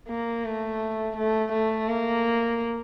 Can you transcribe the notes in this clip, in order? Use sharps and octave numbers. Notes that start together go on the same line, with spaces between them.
A#3
A3
A3
A3
A#3